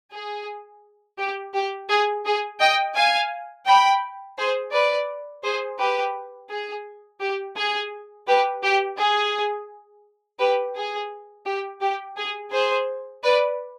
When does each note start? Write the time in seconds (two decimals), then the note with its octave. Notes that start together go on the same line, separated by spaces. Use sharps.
0.12 G#4
1.18 G4
1.54 G4
1.89 G#4
2.25 G#4
2.60 D#5 G5
2.95 F5 G#5
3.66 G5 B5
4.37 G#4 C5
4.73 B4 D5
5.43 G#4 C5
5.79 G4 B4
6.50 G#4
7.20 G4
7.56 G#4
8.27 G4 B4
8.63 G4
8.98 G#4
10.39 G4 B4
10.75 G#4
11.46 G4
11.81 G4
12.17 G#4
12.52 G#4 C5
13.23 B4 D5